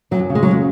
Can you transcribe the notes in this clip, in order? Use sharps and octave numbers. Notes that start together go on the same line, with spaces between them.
F#2 F#3
C#3
G#3
F#3
G#3